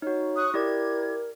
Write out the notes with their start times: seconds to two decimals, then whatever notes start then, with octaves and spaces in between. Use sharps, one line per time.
0.02 D#4 F#4 C#5
0.36 C#6 D#6 F#6
0.54 E4 G4 A#4 D5 G#6